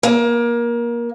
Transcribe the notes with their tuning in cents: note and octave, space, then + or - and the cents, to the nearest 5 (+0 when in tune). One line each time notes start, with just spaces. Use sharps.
A#3 +25